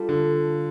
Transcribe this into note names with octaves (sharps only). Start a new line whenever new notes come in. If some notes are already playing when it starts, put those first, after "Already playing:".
Already playing: G3 D4 F4 A4
D3